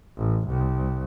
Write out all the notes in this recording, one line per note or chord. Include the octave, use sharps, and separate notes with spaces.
A1
C2